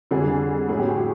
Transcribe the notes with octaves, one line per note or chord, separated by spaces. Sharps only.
F2 D3 G3 G#4
A2 F#3 G#4
G4
F#4
G4